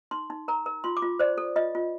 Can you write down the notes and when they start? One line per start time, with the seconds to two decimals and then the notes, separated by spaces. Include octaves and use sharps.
0.11 D#4 C6
0.30 D#4
0.48 A#4 A#5
0.66 A#4
0.84 F4 C6
0.97 D6
1.02 F4
1.19 C5 D5
1.38 A4
1.56 F4 D#5
1.75 F4